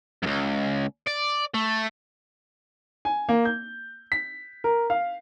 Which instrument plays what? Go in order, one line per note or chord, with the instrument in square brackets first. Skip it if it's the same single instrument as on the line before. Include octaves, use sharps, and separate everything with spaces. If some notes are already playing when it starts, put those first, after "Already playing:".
[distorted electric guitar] C#2 F#2
D5
A3
[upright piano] G#5
A#3
G6
B6
A#4
F5